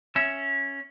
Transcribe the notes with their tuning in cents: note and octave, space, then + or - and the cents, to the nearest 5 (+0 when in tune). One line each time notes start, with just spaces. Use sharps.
C#4 +0 E5 +0